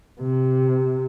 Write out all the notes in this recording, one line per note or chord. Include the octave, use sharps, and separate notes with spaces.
C3